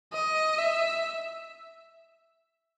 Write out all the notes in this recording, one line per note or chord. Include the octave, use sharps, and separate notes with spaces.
D#5
E5